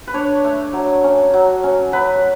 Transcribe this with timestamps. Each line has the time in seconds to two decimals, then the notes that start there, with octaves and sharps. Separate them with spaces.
0.07 B4
0.14 D4 C#5
0.44 A3
0.73 F#3
1.04 C#4
1.34 F#3
1.63 C#4
1.92 F#3 B4